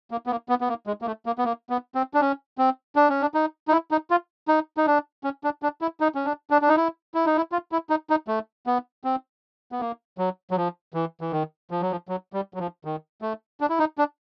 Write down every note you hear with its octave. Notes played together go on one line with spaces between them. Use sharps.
A#3
B3
A#3
B3
B3
A#3
G#3
A#3
A3
A#3
B3
A#3
B3
C4
D4
C#4
C4
D4
C#4
D4
D#4
D#4
E4
D#4
F4
D#4
D#4
D4
C#4
D4
D4
E4
D#4
C#4
D4
D4
D4
D#4
E4
E4
D#4
E4
F4
E4
D#4
D#4
A3
B3
C4
B3
A#3
F#3
F#3
F3
E3
E3
D#3
F3
F#3
F3
F#3
G3
F#3
F3
D#3
A3
D4
E4
D#4
D4